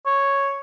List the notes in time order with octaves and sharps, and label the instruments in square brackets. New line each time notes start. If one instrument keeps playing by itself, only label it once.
[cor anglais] C#5